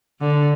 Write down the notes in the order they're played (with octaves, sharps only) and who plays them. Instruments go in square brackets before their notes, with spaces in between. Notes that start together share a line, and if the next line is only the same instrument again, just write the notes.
[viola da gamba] D3